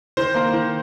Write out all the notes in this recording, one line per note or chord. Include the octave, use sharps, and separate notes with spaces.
D#3 C5
A#3
D#3